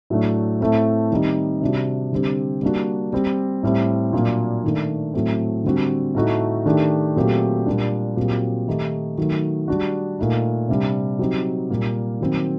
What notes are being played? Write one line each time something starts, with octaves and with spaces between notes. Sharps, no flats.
A2 F#3 A3 D4
A2 A3 C4
D#3 G3 C4 D#4
C3 G3 D4 F#4
D3 G3 C4 G4
G3 A#3 D4 F#4
G3 C4 G4
A2 G3 C4
A#2 F#3 A#3 D4
D#3 A3 D4
A2 F#3 A3 C4
D3 G3 C4 F#4
A2 A3 D#4 F#4
D#3 A3 D4 G4
A#2 F#3 A3 C4 G4
A#2 G3 D4
A#2 F#3 C4 G4
D#3 A3 D#4 G4
D#3 F#3 A3
G3 D4 F#4
A#2 A3 D#4
C3 G3 D4
F#3 C4 D#4 G4
A#2 G3 A#3
D#3 F#3 C4